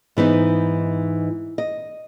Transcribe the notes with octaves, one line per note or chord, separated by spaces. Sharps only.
G#2 E3 B3 D#4
D#5